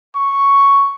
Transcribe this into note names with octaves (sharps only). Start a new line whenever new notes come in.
C#6